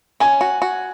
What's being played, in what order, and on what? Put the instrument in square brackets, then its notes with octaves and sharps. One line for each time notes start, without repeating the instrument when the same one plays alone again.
[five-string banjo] C#4 [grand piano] G#5
[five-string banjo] F#4
F#4